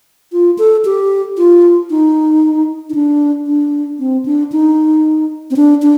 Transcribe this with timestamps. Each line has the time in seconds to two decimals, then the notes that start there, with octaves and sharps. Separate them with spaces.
0.32 F4
0.58 A4
0.85 G4
1.37 F4
1.90 D#4
2.90 D#4
2.94 D4
3.47 D4
3.99 C4
4.25 D4
4.52 D#4
5.51 C4
5.56 D4
5.82 D4